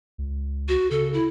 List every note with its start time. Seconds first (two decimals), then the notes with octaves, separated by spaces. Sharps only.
0.18 C#2
0.69 F#4
0.91 C#3 A4
1.14 E4